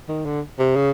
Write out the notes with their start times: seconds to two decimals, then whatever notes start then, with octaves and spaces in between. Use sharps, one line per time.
0.08 D#3
0.25 D3
0.59 C3
0.76 C#3